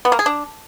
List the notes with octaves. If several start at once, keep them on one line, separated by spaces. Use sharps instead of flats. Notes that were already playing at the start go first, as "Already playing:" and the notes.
B3
A#3
G#4
D4